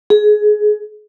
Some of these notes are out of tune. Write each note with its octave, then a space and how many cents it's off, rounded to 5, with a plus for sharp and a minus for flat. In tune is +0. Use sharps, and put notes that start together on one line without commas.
G#4 +20